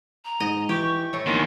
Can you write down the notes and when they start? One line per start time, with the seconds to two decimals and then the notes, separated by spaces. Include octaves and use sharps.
0.25 A#5
0.40 G#2 D#5
0.69 E3 G4 C#6
1.13 A2 A3
1.26 A#1 E2 D#3 C6